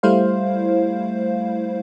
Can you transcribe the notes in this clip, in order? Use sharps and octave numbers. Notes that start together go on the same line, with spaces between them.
G3 A3 E4 C5 F5